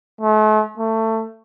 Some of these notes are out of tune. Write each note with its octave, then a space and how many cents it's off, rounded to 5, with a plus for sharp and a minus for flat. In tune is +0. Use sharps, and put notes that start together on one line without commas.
A3 -40
A3 +20